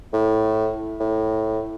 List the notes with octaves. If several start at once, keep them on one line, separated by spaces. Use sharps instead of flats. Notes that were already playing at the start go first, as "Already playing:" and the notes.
A2
A2